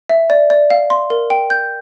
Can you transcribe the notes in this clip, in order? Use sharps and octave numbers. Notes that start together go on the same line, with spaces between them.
E5
D5
D5
F5
C6
A#4
G5
G6